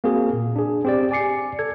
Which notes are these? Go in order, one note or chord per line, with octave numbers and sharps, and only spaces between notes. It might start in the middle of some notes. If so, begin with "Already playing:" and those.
A#3 C4 F#4 G#4
A#2
D4 G#4
C4 G4 D5
D5 G#5 D6 C7 C#7
A4 G#6